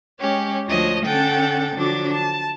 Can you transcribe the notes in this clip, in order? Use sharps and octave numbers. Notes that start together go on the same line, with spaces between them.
G#3 C#4 G4 C#5
D2 F3 D4 C#5 D#5 A#6
D3 C#4 A4 F#5 G5 A6
D3 F3 F#3 D4 D6
A5